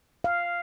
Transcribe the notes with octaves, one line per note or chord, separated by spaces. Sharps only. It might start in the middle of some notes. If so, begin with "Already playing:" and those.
F5